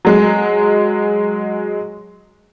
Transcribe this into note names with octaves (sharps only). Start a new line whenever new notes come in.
F#3 G#3